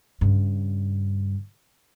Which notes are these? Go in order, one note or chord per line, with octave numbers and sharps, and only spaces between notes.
G2 C#3